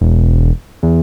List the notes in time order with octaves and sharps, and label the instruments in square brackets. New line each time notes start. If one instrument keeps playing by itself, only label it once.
[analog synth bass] E1
E2